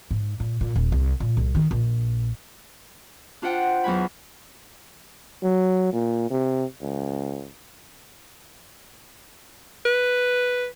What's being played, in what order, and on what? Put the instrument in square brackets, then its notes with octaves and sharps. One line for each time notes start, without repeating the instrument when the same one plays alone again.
[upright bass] G#2
A#2
A#2
D#1
C2
A#2
C2
D#3
A#1
[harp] D4 F4 C5 F#5 G5
E2 F#3 G#5 B5
[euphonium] F#3
A#2
C3
C#2
[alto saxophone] B4